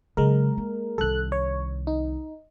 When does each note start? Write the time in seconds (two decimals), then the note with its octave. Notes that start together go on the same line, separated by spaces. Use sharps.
0.17 C#3 F#3 G#3 A#4
0.58 A#3
0.98 C2 D#3 A4 F#6
1.32 C#5
1.87 D#4